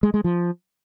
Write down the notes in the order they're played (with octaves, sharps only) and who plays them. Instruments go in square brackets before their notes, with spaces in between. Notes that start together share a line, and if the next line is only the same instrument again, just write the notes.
[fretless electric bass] G#3
G#3
F3